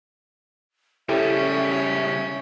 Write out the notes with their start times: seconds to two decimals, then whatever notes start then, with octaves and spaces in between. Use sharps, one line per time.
1.09 C#3 G3 C#4 E4 G4 A4 E5